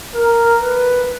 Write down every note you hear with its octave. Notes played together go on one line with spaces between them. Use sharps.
A#4
B4